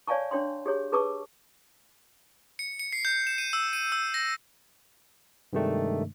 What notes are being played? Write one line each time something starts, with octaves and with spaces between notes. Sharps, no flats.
C#5 D5 F5 G#5 A5 C#6
D4 C#5 G5 C6
G4 G#4 C#5
G#4 B4 A5 C#6 D6 E6
C#7
C#7
C7
G6
E7
D#7
E6
D#7
E6
A#6
G2 C3 D#3 G#3 A3 D4